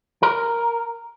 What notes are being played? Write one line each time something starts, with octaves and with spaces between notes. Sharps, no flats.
A#4